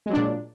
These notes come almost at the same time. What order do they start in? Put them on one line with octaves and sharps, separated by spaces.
G#3 F#3 D4 A#2